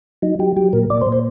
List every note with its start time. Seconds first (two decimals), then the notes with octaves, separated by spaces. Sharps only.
0.22 F#3 D#4
0.39 F#3 G4
0.57 F#3 G4
0.73 A#2 A#4
0.90 A#2 D5
1.01 C5
1.06 A#2
1.12 C5